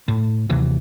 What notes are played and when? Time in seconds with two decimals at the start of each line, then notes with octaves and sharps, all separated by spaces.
0.08 A2
0.49 D#2 C3 E3 F#3